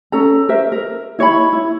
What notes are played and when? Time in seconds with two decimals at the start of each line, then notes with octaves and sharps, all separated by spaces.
0.12 C#4 A4 A#5
0.49 A#4 C5 E5
0.72 A#4
1.19 E4 C#5 D#5 B5
1.53 E4